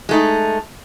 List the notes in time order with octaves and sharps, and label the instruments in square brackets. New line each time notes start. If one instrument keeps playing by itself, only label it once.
[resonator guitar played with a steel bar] G#3 A3 D#4